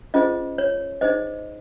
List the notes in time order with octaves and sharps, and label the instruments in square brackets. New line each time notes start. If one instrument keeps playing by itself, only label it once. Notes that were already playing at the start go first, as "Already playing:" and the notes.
[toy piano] C#4 F4 G#4 C5 D#5
C#5
D#4 G#4 C5 D#5